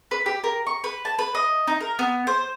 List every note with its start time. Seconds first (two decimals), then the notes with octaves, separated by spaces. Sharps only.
0.11 B4
0.26 G4
0.44 A#4
0.67 C#6
0.84 B4
1.05 A5
1.19 B4
1.35 D#5
1.68 D#4
1.81 A#4
1.99 B3
2.27 C5